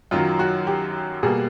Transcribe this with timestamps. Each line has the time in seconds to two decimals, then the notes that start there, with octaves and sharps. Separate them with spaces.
0.11 F#2 D#3 F#3 F4
0.39 F#4
0.67 G4
1.23 B2 G3 A#3 G#4